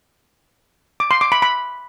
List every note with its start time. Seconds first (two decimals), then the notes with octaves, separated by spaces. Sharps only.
1.00 D6
1.11 C6
1.21 D6
1.32 B5
1.42 B5